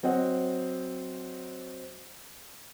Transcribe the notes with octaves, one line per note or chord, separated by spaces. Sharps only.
F#3 C4 D#5 F#5